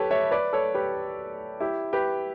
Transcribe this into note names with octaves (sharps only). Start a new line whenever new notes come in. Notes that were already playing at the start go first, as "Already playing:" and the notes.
Already playing: G4 A4 B4 C#5
C#5 E5
B4 D5
A4 C#5
G4 B4
E4 G4
G4 B4